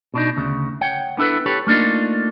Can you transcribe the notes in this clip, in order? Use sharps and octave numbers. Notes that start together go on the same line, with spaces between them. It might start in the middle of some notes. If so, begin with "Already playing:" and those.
B2 D4 D#4
D2 C#3
C#5 F#5 G5
B3 D4 E4 A4 B4
G4 A4 B4 C#5
A3 A#3 D4 D#4 F4